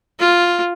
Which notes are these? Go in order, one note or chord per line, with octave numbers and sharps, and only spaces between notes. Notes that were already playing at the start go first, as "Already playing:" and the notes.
F4